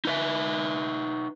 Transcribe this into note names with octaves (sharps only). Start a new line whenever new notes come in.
D#4 B4 E5